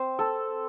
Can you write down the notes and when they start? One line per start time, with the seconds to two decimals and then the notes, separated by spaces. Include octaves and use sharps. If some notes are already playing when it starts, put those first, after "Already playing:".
Already playing: C4 C5
0.19 A4